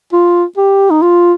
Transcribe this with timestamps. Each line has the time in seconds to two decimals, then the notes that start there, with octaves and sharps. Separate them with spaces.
0.13 F4
0.57 G4
0.90 D#4
1.02 F4